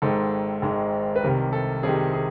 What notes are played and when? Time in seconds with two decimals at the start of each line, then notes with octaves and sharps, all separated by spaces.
0.02 G#1 G#2 D#3 G#3 A4
0.62 G#1 G#2 D#3 G#3
1.16 B4
1.22 C2 C3 D#3 G3 A#4
1.53 A4
1.83 C2 C3 D#3 G3 G#4
2.13 G#4